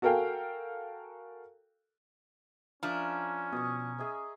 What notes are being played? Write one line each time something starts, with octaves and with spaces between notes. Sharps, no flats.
F#4 A4 A#4 F5 G5 G#5
F3 C#4 D4 A#4 E5
B2 C#6 D#6
G#4 D#5 E5